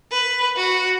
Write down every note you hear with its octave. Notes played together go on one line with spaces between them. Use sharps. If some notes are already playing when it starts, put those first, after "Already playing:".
B4
F#4